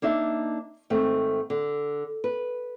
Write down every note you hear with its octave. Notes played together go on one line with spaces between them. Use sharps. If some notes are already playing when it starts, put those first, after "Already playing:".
A#3 D4 D#4 E5
G#2 D#3 A3 C4
D3
B4